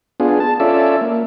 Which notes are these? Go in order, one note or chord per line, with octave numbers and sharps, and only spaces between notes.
B3 D4 F4 G#4
A5
C#4 F4 A4 D5 E5
A#3